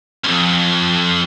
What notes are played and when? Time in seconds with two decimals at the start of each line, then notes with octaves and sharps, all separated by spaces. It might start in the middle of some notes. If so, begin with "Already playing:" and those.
0.24 C2 F2